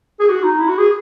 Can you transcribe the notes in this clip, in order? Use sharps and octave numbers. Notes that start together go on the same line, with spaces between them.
G#4
F#4
D#4
E4
F#4
G#4